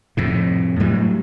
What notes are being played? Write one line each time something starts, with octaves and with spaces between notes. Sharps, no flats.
F2 A2 C3
A2 F#3 G3